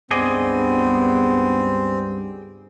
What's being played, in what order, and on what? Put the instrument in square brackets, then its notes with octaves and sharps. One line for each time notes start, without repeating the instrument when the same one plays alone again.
[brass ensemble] C#2 G2 [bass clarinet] B3 [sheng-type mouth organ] C4 [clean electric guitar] G#4 D5 D#5